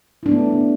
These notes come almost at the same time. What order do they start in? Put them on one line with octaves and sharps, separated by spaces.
E4 D4 B3 A3